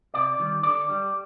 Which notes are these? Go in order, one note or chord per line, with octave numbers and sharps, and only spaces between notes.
C3 D5
D#3 G3
D3 D5
G3